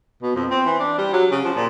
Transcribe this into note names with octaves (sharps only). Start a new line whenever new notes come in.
B2
F2
C4
E3
D4
G3
F#3
C#3
F3
A#2